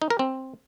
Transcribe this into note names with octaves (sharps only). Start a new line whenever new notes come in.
D#4
A#4
C4